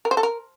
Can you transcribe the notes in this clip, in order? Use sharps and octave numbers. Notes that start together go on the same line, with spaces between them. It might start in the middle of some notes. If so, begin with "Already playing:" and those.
A#4
C5
A4
A#4